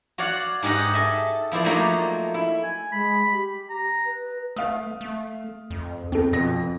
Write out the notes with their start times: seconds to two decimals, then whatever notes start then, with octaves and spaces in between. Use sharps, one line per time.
0.18 F#4 C#5 D5 F5 F#5
0.63 G#2 G4 G#4 D#5 F#5
0.94 A4 D#5 E5
1.52 F3 E4 C5 D5
1.64 F3 F#3 A3 A#3 D#4
2.34 E4
2.63 G#5
2.92 G#3 B5
3.32 G4
3.70 A#5
4.06 B4
4.56 A3 F5 D#6
5.01 A3
5.70 F2
6.12 F2 C4 A4
6.33 F2 B2 A#6